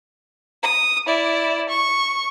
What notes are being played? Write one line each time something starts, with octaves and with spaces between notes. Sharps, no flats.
D#6
E4 D5
C#6